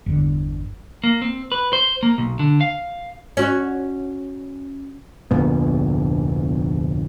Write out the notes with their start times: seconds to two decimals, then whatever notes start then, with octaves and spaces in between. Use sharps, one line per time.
0.06 G1 E2 D3
1.04 A#3
1.22 C4
1.52 B4
1.73 C5
2.03 A#3
2.18 B1
2.39 D3
2.61 F5
3.37 C#4 F#4
5.31 F1 D2 A#2 B3